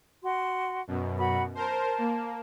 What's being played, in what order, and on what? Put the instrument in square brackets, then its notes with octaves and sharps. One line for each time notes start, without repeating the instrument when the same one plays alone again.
[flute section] F#4 C6
[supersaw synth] F#2 B2
[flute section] F#4 B5
[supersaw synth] A#4 C5 [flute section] A5
[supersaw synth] A#3